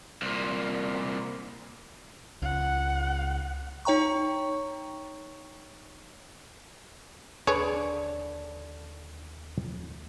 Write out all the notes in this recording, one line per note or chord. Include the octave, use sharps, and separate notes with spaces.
C2 A#2
C#2 F#5
D#4 C#5 G5 A#5 C#6
D#2 D3 G#4 A4 B4 C#5 D5